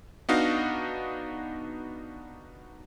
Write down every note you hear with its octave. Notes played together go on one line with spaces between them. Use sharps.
B3 D4 D#4 F#4 D#5 F5